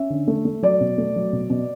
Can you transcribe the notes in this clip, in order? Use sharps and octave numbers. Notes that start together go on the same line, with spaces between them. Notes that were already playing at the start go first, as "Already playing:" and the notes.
Already playing: C#4 E5
D3
A3
A3
F#3 D5
B2
A3
F#3
B2
B2